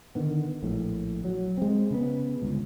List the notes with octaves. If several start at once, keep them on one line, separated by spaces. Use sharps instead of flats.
D3 D#3 B3
A#1 A2
F#3
G#3 C4
C#3 B3
G1 C#2